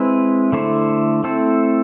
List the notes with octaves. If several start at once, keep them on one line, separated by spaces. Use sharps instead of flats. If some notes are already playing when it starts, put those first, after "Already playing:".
Already playing: G#3 C4 E4 B4
D3 A3 E4 A4 C5
A3 C4 E4 A4 C5